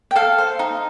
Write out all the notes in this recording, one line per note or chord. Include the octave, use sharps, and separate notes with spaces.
G5
A4 F5
C5
D#4